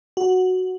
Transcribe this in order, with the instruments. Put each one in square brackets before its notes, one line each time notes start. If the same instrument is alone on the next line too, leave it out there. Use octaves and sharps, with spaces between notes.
[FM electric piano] F#4